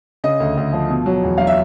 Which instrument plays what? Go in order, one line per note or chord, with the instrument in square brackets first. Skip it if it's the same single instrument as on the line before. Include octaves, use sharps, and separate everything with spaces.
[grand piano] C#3 D#5
D2
D2
F3
B2
F#3
E2
F#3 F5
E5